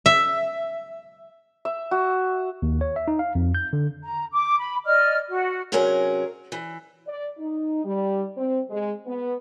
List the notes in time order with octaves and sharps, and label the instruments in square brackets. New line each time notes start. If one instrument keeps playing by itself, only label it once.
[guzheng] E5
[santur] E5
F#4
[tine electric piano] D#2
C#5
E5
D#4
F5
F2
G6
D3
[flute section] A#5
D6
B5
D5 D#5 F6
F#4
[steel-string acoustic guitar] C3 F#3 C#4 G#4 A#4
E3
[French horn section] D5
D#4
G3
C4
G#3
B3